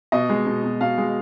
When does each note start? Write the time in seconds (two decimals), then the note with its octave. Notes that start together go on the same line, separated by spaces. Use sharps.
0.12 B2 D#5
0.30 G#3
0.46 B2
0.64 B2
0.81 B2 F5
0.98 G#3